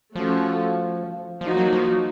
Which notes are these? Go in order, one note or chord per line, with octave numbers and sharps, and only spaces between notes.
F3 A3 C#4 F#4 A4
F3 A#3 D#4 F#4
F#3
F3